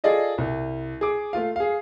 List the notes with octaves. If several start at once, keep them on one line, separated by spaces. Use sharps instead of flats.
F4 G#4 A4 D5 D#5 F5
C2
G#4 D6
A3 F4 F5
G#4 F5